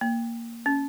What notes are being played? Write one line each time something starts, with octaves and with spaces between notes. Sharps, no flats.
A#3
C#4